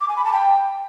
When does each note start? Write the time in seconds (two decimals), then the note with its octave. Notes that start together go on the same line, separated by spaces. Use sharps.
0.01 D6
0.09 G#5
0.17 B5
0.25 A5
0.33 G5